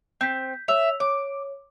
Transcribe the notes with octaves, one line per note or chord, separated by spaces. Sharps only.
C4 G6 B6
C#5 E5 E6 F7
C#5 D6